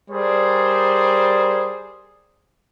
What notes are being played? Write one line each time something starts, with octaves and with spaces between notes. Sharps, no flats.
G3 G#4 A#4 C5 D5